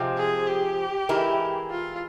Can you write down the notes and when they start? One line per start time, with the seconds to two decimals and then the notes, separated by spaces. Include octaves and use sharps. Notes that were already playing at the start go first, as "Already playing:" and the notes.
Already playing: C3 F3 G#3 C4
0.18 G#4
0.48 G4
1.09 E3 G#3 E4 A#4
1.71 F4